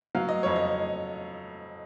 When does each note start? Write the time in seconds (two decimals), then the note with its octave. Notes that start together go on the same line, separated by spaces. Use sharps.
0.15 F#3 F5
0.29 D#5
0.43 F2 C#5
0.56 D#5